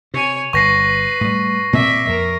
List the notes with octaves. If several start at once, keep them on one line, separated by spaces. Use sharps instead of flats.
C3 C#5 G#5
G1 B4 C#6 A#6 C7
A2 G3
A#2 A#3 C4 D5 E5
F2 A#4